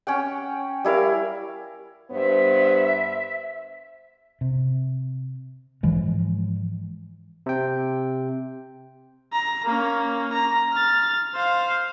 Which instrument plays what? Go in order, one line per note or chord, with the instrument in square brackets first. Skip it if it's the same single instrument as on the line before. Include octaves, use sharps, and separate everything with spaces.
[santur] C#4 F#5 G5
G3 E4 A#4 F5
[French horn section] G2 B3 C5 [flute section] E5
[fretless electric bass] C3
G#2 E3 F3 G#3
[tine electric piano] C3 G5
[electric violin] A#5
A#3 C#4
A#5
F6 A6
C5 F5